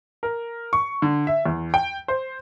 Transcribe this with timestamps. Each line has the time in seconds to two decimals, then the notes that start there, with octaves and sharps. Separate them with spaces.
0.23 A#4
0.73 C#6
1.02 D3
1.27 E5
1.46 E2
1.74 G5
2.08 C5